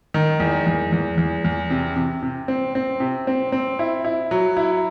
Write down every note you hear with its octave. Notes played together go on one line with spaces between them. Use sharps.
D#3
E2
E2
E2
E2
E2
C3
C3
C3
C4
C4
C3
C4
C4
E4
E4
F#3
E4